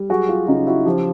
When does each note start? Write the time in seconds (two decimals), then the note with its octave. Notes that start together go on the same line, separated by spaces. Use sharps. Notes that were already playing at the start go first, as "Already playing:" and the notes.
Already playing: G3
0.10 F#3 F#4 G#4
0.29 F4 G4
0.47 C#3 D#4 F4
0.67 E4 F#4
0.86 F3 F4 G4